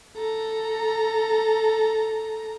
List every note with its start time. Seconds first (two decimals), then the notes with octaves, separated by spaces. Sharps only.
0.16 A4 A#5